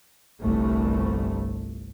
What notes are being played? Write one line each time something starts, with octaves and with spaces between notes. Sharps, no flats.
G1 C2 A3